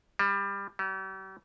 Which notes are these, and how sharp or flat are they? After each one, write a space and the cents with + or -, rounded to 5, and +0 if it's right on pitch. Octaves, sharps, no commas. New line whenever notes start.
G3 +20
G3 -45